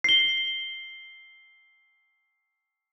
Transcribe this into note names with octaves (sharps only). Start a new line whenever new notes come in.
C7 G7